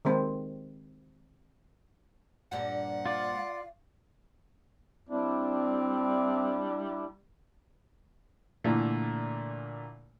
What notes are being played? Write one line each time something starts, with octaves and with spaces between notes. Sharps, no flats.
D#3 G#3 C4
G2 A#2 F3 F#5
F4 D5 F5
G3 C4 D4 E4
A#2 D3 E3 A3